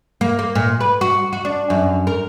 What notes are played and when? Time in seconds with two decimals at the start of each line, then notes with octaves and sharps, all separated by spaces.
0.21 A#3
0.39 A#3
0.55 A#2
0.81 B4
1.01 F#4
1.33 F#4
1.45 D4
1.70 F#2
2.07 A#4